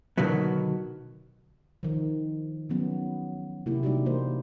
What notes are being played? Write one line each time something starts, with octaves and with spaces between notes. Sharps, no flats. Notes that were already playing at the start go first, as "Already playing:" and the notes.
B2 D3 D#3 F#3 B3
D#3 F3
D#3 F3 F#3 B3 C#4
C3 A#3 E4 G4
G3 D4 D#4 F#4 G4
E3 A#3 C5